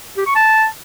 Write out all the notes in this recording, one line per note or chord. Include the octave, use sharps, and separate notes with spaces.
G4
C#6
A5